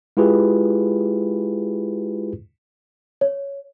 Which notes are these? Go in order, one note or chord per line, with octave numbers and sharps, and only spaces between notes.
G#3 E4 F4 G4 G#4 B4
C#5